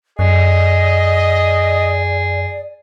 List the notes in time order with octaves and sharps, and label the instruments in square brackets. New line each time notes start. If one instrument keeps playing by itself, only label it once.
[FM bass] F#2 [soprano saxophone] G#4 [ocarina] D5 [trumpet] D#5